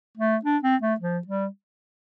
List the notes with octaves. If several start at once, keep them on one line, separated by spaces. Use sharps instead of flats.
A3
D4
C4
A3
F3
G3